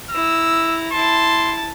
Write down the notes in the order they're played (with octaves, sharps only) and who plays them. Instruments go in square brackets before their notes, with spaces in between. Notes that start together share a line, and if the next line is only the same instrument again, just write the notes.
[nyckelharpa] E4 A#5 [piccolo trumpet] E6
[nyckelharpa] E4 A5 [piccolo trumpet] C6